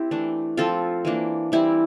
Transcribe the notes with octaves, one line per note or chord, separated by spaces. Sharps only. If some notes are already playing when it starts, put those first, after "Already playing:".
Already playing: C4 E4 G4
E3 A3 D4
F3 C4 F4 A4
E3 A#3 D4
E3 G3 C4 E4